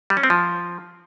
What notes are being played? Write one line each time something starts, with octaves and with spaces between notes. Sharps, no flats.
G3
C#4
C4
F3